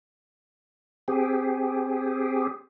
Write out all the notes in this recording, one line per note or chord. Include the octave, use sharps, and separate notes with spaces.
C4 G4 G#4